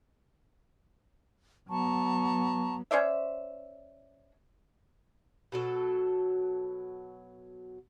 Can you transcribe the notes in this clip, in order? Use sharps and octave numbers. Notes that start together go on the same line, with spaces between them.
F#3 B3 A5 A#5 C#6
C#4 C5 D5 E5
B2 F#3 A4